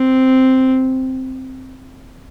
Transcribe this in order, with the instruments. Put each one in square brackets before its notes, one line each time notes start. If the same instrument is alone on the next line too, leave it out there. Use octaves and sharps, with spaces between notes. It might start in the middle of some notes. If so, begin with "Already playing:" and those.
Already playing: [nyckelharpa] C4